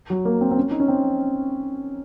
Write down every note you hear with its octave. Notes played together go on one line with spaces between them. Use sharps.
F#3
A#3
C4
C4
C#4
D#4
C#4
C4